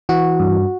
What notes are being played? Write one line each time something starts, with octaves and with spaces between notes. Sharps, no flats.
E3 F#4
G2